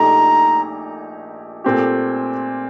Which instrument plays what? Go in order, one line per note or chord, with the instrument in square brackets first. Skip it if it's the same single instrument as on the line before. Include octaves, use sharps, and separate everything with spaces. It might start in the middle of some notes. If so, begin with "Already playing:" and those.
Already playing: [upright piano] A#1 A#2 A3 D#4 G4 [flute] A#5
[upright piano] A#2 A3 C4 G4